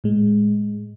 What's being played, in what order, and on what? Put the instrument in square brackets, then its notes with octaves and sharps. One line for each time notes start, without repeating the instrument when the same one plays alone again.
[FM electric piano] A2 G#3